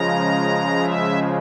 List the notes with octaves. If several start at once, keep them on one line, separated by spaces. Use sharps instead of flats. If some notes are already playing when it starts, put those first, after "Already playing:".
Already playing: C#3 F3 G#3 A#5
E5